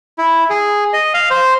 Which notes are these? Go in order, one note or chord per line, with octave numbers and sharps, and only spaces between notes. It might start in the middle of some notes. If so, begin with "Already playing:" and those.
E4
G#4
D#5
F5
C5